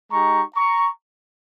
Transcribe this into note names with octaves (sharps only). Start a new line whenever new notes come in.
G#3 D#4 G4 A#5 C#6
A#5 C#6